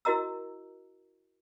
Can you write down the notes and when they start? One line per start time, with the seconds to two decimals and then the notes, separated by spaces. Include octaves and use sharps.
0.05 E4 F#4 A#4 D#5 A#5 E6